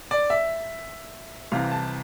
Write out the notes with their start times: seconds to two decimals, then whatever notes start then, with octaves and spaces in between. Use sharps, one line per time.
0.11 D5
0.30 E5
1.52 C2 C3 E3 F5
1.72 A5